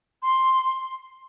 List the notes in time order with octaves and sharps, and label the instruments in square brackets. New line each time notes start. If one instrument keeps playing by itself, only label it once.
[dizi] C6